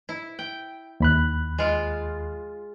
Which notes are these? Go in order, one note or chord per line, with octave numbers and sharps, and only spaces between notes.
E4
G5
D#2 B5 F#6
G#3 F4